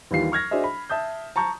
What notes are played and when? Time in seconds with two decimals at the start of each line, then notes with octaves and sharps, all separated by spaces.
0.11 D#2 E3 G3 F4 C7
0.32 C#6 F6 G#6 A#6
0.51 D4 F#4 G#4 C5 D#5 E5
0.64 B5
0.90 E5 A5 D#6 G6
1.36 A5 A#5 C#6 G6